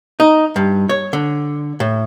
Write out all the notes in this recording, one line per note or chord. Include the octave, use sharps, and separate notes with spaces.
D#4
G2
C#5
D3
A2